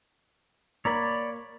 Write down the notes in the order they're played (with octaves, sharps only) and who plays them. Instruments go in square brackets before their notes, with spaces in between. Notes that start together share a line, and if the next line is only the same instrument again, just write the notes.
[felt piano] A#3 A#5 [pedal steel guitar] C#5 D5 B5